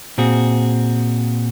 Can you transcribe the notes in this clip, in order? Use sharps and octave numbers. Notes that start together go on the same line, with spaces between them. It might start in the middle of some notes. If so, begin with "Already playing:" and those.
A#2 C4 F#4 G#4